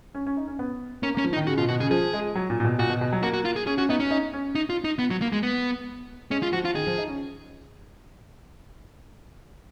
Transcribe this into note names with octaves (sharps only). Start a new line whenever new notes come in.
C#4
C#4
D#4
C#4
B3
A#3 C#4
A#3
C#4
F3
D#4
D#3
C#3 F#4
B2 F4
B2 F#4
C#3 G#4
F3 G#4
G#3
F#3
A#2
A#2
B2
A#2 F#4
B2
B2
F#3
A#3 F#4
F#4
F4
G#4
C#4 G#4
C#4 F#4
B3 D#4
C#4
D#4
C#4
D#4
F4
D#4
B3
F#3
A#3
G#3
B3
G#3 C#4
F4
F3 F#4
F4
D#3 G#4
F3
D#4
C#4